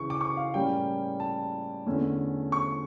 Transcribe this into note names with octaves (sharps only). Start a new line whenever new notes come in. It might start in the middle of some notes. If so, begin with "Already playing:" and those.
Already playing: C#2 C#3 E3 C#6
D6
C#6
F5
A2 G3 A#3 C#4 G5
A5
E2 D3 A3 C#4
C#6